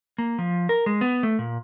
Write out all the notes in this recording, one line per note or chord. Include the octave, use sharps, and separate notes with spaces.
A#3
F3
A#4
G#3
B3
A3
A#2